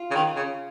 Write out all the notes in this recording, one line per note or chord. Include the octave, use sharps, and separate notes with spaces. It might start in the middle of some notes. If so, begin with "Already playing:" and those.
Already playing: F4
C#3
D#3
C#3